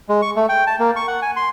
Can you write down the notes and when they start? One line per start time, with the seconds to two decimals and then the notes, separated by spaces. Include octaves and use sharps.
0.09 G#3
0.22 C#6
0.36 A3
0.49 G5
0.67 A5
0.79 A#3
0.96 C#6
1.08 F#5
1.22 G#5
1.36 C6